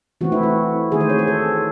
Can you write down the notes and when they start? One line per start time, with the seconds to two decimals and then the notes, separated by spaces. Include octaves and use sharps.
0.21 E3 A3 C4 F#4
0.32 E4
0.43 F#4
0.92 D#3 A3 C4 G#4
1.00 C5
1.10 C#5
1.19 C5
1.28 A4